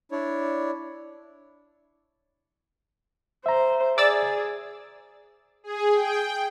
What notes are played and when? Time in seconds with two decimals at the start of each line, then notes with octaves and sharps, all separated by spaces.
0.12 D4 E4 C#5 D5
3.46 C5 E5 A#5
3.98 G#4 D5 E6 A6
5.64 G#4
5.94 G5